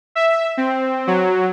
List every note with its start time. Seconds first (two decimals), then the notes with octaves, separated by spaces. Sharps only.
0.15 E5
0.57 C4
1.07 F#3